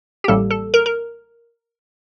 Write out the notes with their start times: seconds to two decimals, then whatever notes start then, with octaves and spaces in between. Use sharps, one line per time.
0.24 G4
0.28 A1 A2 G3 A#3 A4
0.51 A4
0.74 A#4
0.86 A#4